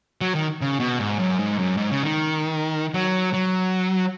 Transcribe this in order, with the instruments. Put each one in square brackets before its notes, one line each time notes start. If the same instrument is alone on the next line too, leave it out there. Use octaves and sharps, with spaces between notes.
[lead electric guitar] F#3
D#3
C#3
B2
G#2
F#2
G#2
F#2
G#2
C#3
D#3
F#3
F#3